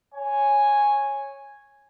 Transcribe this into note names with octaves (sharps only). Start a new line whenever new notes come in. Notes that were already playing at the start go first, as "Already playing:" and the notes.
C#5 G#5